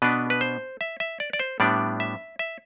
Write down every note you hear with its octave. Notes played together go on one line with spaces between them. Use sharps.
B2 B3 D4 B4
B4
C5
E5
E5
D5
D5
C5
A2 G3 B3 D4 D5
E5
E5